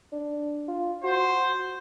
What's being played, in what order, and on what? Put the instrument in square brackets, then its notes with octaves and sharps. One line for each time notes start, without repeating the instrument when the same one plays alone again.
[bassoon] D4
F4
[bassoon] F#4 [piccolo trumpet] C5